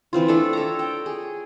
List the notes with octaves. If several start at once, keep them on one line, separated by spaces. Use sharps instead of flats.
E3 C4 F4
A3 D4 A4
A4 C#5 A#5
G5
G#4